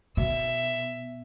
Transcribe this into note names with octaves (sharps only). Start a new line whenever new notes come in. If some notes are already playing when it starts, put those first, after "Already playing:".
B2 E5